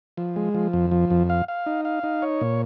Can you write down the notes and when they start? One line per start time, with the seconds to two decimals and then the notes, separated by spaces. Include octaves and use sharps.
0.17 F3
0.36 G#3
0.55 F3
0.73 F2
0.91 F3
1.10 F2
1.30 F5
1.48 F5
1.66 D#4
1.85 F5
2.03 D#4
2.22 C#5
2.41 A#2